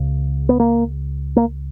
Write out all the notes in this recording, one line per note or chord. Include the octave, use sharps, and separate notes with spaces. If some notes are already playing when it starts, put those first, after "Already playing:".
Already playing: C#2 C#3
B3
A#3
A#3